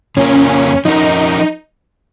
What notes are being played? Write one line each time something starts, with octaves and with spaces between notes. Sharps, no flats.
F2 C#3 A#3 C#4 F4 A#4
F3 C#4 D#4 A#4